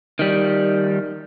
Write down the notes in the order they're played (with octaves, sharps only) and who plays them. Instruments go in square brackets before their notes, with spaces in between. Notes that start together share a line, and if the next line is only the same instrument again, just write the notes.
[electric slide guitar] D#3 G3